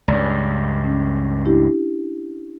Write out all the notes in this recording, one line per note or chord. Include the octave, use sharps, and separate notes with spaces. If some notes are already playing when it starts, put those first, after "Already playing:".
C#2 G2 D5
C#4
D4 E4 G4